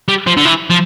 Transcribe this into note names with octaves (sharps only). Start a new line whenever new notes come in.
G3
F3
D3
E3
F3